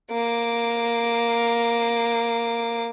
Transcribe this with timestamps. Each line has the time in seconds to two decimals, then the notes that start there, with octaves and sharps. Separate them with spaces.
0.12 A#3 D6